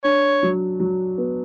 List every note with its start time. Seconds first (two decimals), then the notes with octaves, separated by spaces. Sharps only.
0.04 D4 C#5
0.43 F#3
0.80 F#3
1.18 B3